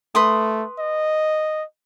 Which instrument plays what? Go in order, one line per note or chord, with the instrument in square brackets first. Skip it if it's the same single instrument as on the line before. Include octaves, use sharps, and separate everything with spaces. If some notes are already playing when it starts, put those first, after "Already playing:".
[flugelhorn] A3 [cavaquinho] B4 C6 D#6
[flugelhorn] D#5